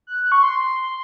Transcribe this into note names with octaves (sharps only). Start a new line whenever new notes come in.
F#6
F#6
C#6
C6